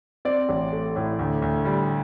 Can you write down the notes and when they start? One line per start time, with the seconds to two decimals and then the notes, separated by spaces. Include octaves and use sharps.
0.25 C4 D5
0.49 A1
0.72 A3
0.96 A2
1.19 D2
1.42 D2
1.65 G3